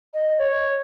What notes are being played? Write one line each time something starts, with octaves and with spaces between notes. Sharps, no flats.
D#5
C#5